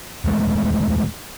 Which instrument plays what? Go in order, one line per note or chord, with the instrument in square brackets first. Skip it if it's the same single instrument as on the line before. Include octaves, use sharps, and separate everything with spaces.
[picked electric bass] D#1 E2 G#3 A3